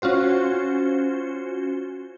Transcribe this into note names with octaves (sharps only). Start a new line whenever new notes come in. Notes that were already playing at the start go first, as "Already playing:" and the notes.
C#4 F4 F#4 C5